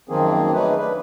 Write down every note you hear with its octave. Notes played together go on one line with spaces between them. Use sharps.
F#2 D#3 F3 A#3 C4 G#4
A3 C#4 D#4 G#4 B4
D4 B4